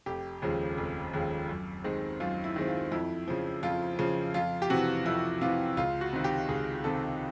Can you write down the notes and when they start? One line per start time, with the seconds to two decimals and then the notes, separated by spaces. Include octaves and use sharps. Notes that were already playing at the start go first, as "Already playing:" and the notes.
0.06 F1 G4
0.42 D#2 C#3 F3 G#3
0.78 F1
1.13 D#2 C#3 F3 G#3
1.49 F#2
1.84 D#3 G#3 C4
2.20 F#2 F4
2.44 E4
2.56 D#3 G#3 C4
2.68 F4
2.92 F2 E4
3.28 C#3 F3
3.63 F2 F4
3.99 C#3 F3
4.34 F2 F4
4.62 G4
4.70 C3 E3 F#4
5.05 F2 E4
5.41 C3 E3 F4
5.77 C#2 F4
6.01 F#4
6.13 C3 D#3
6.24 G4
6.48 C#2 G#4
6.84 C3 D#3 A4